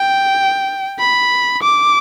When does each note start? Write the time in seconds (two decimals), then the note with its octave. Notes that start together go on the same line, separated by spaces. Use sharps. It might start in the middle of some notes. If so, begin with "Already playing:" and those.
Already playing: G5
0.99 B5
1.62 D6